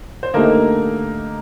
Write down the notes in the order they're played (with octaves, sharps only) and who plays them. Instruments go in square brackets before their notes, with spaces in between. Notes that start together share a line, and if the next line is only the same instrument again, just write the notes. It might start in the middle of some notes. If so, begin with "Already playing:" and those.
[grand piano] C5
[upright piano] D3 A3 D#4 G4 [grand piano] A#3 A#4